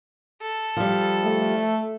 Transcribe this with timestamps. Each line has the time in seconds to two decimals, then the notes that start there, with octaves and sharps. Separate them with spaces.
0.42 A4
0.77 F3 G3
1.24 A3